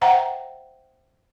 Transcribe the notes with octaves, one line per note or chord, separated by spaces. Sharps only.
C5 E5 F#5 G5 A#5